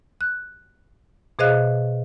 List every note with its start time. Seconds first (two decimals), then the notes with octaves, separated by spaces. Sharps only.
0.21 F#6
1.39 B2 G#4 C5 D#5 F5 F#6